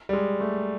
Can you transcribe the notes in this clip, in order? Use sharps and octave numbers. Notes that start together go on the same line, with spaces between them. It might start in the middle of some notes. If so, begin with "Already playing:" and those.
G3
G#3
A3